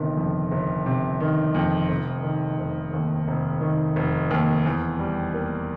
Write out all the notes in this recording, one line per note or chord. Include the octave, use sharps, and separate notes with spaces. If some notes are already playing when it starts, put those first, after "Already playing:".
Already playing: G1 C3 D#3
F2
G1
C3
D#3
F2
F1
D#3
F1
D#2
F1
D#3
F1
D#2
E2
G3
A#3